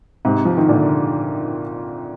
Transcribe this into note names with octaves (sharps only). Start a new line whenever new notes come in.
G#2 C3
F3
D#3
A#2 D3